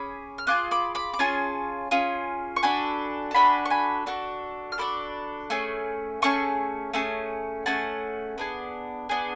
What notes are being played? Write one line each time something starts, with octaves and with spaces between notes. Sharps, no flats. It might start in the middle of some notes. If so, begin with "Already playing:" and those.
Already playing: C#4 G#4 B5 D6
F6
C#4 F4 G#4 D6 F#6
B5 D6
B5 D6
D6
C#4 F4 G#4 A5 C#6
C#4 F4 G#4
C#6
D4 F#4 A4 G#5 B5
A5
D4 F#4 A4 G#5 B5
C#6
G#5 B5
D4 F#4 A4
F6
D4 F#4 A4 B5 D6
A3 C#4 G#4
A3 C#4 G#4 A5 C#6
A3 C#4 G#4
A3 C#4 G#4 F#5 A5
B3 D4 G#4
B3 D4 G#4